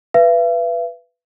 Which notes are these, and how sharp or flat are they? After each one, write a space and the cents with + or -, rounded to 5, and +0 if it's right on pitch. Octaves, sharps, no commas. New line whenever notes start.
B4 +0 E5 +45